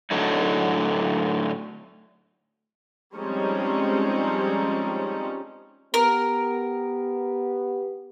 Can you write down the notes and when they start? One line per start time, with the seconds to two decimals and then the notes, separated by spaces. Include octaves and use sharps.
0.11 A2 D3 F#3 D#4
3.14 F3 G3 G#3 C4 C#4 D#4
5.94 B3 G4 A#4